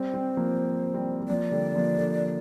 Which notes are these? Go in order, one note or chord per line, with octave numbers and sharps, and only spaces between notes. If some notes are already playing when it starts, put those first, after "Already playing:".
Already playing: G3 C4 C5
G3 C4
F3 A#3
G3 C4
G3
F3 A#3 D5
D3 G3
F3 A#3
D3